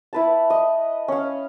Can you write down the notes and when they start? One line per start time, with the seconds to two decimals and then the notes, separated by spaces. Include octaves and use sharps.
0.13 E4 B4 A5
0.50 D#5
1.08 C#4 F5